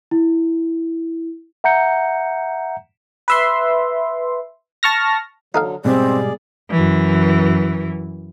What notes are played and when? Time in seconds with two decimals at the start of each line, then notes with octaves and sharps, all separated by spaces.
0.11 E4
1.64 E5 F#5 A#5 G6 C#7
3.28 B4 E5 C6
4.83 A5 C#6 F6 A#6
5.55 D3 F#3 D#4 A4 F5
5.85 G#2 B2 G3 C4 G#4 D5
6.71 F#2 E3